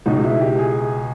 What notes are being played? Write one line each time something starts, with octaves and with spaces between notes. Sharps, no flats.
C#2 B2 D#4
E4
G4
G#4